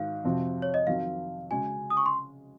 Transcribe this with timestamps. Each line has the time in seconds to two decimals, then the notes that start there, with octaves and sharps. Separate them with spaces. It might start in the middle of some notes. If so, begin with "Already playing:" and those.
Already playing: G#2 D#3 F#4 F5
0.24 F2 C3 F3 C4 F#4
0.62 C#5
0.74 D#5
0.87 F2 D#3 F#3 C4 F#4 F5
1.50 C#3 G#3 C#4 F#4 G#5
1.90 D#6
1.97 C#6
2.06 C6